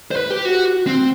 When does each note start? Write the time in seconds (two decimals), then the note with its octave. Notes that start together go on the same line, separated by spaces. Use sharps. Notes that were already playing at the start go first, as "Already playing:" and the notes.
0.11 C5
0.16 B4
0.30 G4
0.45 F#4
0.87 C4